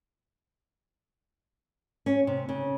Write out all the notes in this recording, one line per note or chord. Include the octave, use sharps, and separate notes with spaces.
C#4
C3
C#3